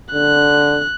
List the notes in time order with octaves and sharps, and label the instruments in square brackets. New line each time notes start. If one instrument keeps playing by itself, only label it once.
[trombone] D3 [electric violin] F#6